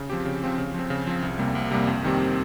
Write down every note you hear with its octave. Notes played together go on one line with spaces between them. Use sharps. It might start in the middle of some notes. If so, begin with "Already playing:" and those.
Already playing: C#3
F3 C4 G4
C#3
F3 C4 G4
C#3
F3 C4
C#3
F3 C4
C2
C3 G3 A#3
C2
C3 G3 A#3
F2
D#3 G3 C4 G4